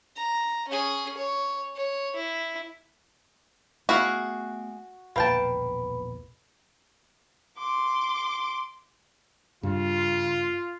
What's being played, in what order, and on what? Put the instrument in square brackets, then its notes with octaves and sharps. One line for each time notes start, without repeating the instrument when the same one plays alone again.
[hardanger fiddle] A#5
C#4 G#4
C#5
C#5
E4
[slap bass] A3 B3 [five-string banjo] E4 G#4 F5 [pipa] F#4
[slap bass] A#1 E2 B2 [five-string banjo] A#3 G5 A5 [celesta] B4 B5
[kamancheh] C6 D6
[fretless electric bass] G2 [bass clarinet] C#3 [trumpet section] F4